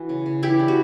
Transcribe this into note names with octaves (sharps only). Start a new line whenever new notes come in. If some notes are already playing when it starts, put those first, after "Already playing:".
Already playing: E3 F#4
C#3
C#3
E3 E4 G4
D4
F#4